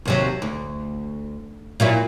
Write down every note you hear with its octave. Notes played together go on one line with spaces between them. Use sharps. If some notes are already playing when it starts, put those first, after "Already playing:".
D#2 C3 F#3
D2
A#2 F#3 E4